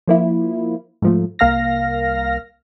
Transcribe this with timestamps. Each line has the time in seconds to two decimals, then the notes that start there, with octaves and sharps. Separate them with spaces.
0.08 F3 A#3 E4
1.02 G#2 F3 A3
1.39 C2 A#3 F5 F6 A#6